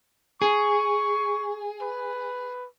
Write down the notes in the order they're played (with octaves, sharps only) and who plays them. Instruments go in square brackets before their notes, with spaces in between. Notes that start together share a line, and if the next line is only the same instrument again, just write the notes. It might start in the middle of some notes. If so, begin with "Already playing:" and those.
[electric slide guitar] G#4 [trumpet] C#6
[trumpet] B4